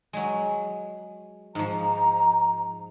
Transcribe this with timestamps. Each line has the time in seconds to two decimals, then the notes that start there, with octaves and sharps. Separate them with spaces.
0.13 F#3 G#3
1.55 G#2 F3 A#5